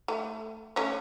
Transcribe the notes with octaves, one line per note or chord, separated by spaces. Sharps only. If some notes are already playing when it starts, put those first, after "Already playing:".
A3
A3 C#4